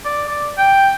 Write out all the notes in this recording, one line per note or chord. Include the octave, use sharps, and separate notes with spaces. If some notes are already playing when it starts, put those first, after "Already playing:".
D5
D5
G5